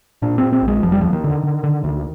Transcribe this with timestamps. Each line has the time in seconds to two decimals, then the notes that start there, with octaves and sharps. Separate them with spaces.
0.22 A#2 D4
0.38 A#2 C4
0.52 C4
0.62 A#1
0.68 G#3
0.82 F1 F3
0.92 G3
1.02 D#2 F3
1.13 D#3
1.24 D3
1.43 D3
1.64 D3
1.84 D2